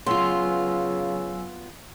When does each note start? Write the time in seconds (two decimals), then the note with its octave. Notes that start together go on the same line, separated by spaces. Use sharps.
0.06 C#3 F#3 B3 F4 G#5 C6 E6